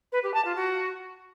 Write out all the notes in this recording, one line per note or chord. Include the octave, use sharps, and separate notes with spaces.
B4
G4
A5
F4
F#4